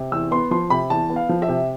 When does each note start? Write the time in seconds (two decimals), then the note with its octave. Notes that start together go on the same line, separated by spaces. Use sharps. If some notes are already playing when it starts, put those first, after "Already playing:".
Already playing: C3
0.12 E2 E6
0.31 B3 C6
0.51 F3 C6
0.70 C3 B5
0.90 E2 A5
1.10 B3
1.16 F5
1.29 F3
1.42 E5
1.48 C3